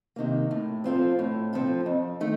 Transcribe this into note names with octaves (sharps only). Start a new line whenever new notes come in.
C3 D#3 A#3
A2
F3 C4 F4 A4
A2
F3 C4 F4 A4
F2
D#3 A3 D#4